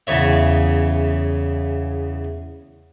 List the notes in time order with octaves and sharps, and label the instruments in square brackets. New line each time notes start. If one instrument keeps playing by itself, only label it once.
[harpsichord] E2 C#3 C#5 E5